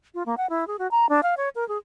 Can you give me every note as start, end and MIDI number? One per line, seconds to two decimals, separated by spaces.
0.15 0.23 65
0.26 0.35 58
0.38 0.49 78
0.50 0.67 64
0.67 0.76 68
0.79 0.90 66
0.91 1.09 82
1.09 1.21 62
1.23 1.35 77
1.37 1.49 73
1.55 1.67 70
1.68 1.78 68